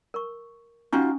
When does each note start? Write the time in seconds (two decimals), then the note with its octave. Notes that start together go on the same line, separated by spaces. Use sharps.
0.14 A#4 C#6
0.93 C#4 D#4 F4 F#4 G#5 C#6